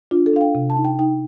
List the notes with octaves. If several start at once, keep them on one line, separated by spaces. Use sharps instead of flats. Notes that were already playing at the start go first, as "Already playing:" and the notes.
D4 F4
A4
D4 F5
G5
C3
A5
D#4
G5
D#4 G5